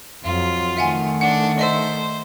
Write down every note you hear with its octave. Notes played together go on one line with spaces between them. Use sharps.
F2 F#3 F4
D#3 A3 E5 F#5 G#5
D4 F#5
C5 D#5 E5 E6